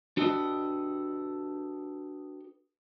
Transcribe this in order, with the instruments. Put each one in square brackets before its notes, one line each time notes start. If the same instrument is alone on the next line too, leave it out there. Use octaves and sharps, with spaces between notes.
[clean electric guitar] D4 F#4 G4 A4 B4 D#5